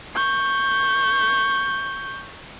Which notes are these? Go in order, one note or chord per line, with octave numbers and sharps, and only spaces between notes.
C#6 G6